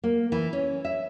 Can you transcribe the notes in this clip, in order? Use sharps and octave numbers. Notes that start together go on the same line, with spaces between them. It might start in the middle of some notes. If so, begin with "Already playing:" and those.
A#3
E3
C#4
E5